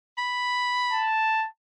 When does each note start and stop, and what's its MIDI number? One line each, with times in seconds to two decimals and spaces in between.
0.18 1.11 83
0.92 1.47 81